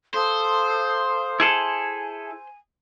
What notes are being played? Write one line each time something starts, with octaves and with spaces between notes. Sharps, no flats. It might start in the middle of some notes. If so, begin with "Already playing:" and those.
A4 C5 F5 D#6
E4 G#4 A4 G#5